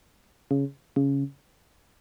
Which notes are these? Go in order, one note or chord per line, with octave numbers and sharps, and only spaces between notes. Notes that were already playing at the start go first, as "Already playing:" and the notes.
C#3
C#3